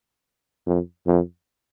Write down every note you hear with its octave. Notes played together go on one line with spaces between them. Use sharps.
F2
F2